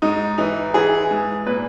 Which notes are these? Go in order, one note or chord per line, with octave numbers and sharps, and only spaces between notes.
G#2 D#4
E3 D#4
E3 G#4
G#2
A#2 B4